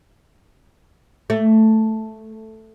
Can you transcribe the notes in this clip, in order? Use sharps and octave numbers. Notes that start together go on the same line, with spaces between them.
A3